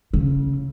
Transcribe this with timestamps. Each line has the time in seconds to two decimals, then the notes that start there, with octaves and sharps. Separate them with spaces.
0.13 C#3